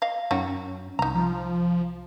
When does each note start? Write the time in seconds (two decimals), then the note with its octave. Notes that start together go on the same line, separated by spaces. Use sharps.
0.02 D#5 F5
0.31 F#2 D#3 F#3 C#4 F#4
0.99 C2 D#4 A#5
1.15 F3